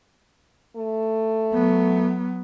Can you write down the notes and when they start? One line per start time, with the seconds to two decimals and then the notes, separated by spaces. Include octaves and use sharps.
0.77 A3
1.53 F#3 B3